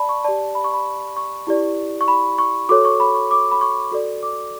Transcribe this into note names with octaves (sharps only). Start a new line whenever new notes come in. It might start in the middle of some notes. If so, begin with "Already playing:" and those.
Already playing: D5 A5 B5
C#6
G4 D5 A5
B5
C#6
B5
C#6
E4 G4 D5
C#6
B5
C#6
F#4 A4 C#5 D6
C#6
B5
C#6
D6
B5
C#6
F#4 A4 D5
D6